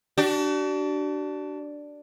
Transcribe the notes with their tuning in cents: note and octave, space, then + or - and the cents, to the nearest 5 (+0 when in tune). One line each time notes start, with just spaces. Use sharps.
D4 +0 F#4 +45